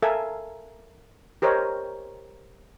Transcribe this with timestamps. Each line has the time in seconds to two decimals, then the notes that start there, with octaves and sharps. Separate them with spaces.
0.02 A4 A#4 E5 F5 G#5
1.42 G4 A#4 C5 C#5 D#5